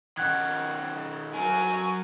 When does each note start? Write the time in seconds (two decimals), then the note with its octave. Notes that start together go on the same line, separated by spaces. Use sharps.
0.17 D#3 C#4 F#5 F#6 G#6
1.34 F#3 A#4 G#5